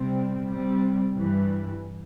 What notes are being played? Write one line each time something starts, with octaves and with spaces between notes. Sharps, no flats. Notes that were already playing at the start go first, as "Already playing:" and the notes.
Already playing: C3 G3 C4
C3 G3 C4
G2 E3 G3